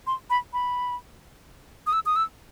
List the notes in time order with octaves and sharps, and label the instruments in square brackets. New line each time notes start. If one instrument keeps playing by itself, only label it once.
[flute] C6
B5
B5
D#6
E6
D#6
E6